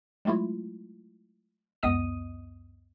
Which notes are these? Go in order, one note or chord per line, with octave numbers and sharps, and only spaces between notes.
F#3 G#3 A3 E4 F4
C#2 F#2 B3 D#5 D#6 D#7